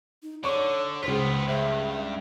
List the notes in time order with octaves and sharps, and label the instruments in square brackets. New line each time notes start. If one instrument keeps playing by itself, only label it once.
[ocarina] D#4
[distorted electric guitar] D3 [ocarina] C#5 [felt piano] D5 C#6
[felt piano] C#2 B6 [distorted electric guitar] B3 F4 [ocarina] C5
[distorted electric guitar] G2 [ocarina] E5